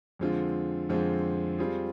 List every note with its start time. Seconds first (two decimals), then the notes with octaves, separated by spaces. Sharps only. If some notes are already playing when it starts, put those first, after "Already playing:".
0.19 F2 D3 G#3 C4 F4
0.89 F2 D3 G#3 C4 F4
1.58 G3 C4 F4 G#4